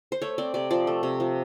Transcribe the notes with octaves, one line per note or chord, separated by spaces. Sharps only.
C5
A3 C#5
C4 D5
C3 D5
F3 D5
A3
C3
F3